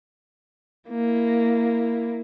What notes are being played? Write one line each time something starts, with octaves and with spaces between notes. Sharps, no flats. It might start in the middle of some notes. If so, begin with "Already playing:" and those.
A#3 E4